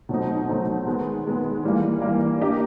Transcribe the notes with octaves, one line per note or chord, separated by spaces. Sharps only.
B2 F#3 A3 C4 D#4
B2 F#3 A3 C4 D#4
D#3 G#3 B3
D#3 G#3 B3
E3 G3 A#3
E3 G3 A#3
A#3 D4 G4 A#4 D#5